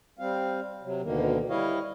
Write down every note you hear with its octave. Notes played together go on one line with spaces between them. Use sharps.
G3 C4 F5
C3 F#3
D2 B2 D3 D#3 A#3
G3 E4 C#5 D#5 F5